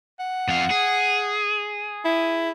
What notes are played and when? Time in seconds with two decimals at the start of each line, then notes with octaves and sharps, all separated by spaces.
0.20 F#5
0.48 F2 F5
0.71 G#4
2.05 E4